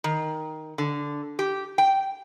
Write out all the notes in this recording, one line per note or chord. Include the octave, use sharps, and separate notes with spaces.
D#3
D3
G4
G5